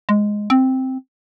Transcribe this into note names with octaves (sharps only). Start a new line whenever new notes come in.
G#3
C4